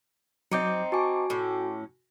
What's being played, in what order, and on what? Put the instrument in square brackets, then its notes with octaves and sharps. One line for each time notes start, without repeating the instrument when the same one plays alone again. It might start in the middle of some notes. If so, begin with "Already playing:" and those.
[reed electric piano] F#3 D6 G6 [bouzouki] C4 D#4 [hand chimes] D#5 C#7
[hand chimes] F#4 G#5 [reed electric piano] A5 C#6 D6
[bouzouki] A2 C#4